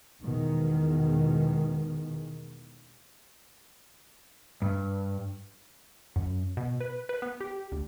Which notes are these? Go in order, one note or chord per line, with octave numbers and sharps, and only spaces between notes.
E2 B2 D#3 G#3
G2
F#2
B2
B4
B4
B3
G4
D2